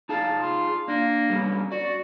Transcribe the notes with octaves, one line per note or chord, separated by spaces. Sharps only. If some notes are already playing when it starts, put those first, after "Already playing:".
D#4 G#4 F5 A5
F4
A#3 D4
G3 B3 C#4
F#4 D5